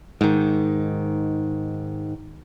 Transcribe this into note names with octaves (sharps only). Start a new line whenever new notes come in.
G#2 D#3